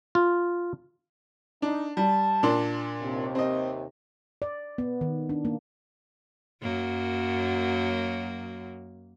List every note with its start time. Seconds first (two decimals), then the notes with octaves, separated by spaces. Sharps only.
0.15 F4
1.62 D4 D#4
1.97 G3 A5
2.43 A#2 D4 C6
3.02 D#2 C3
3.35 C4 D#5
4.42 D5
4.78 B3
5.01 D#3
5.29 D4
5.45 A#3
6.62 F#2 F#3 A#3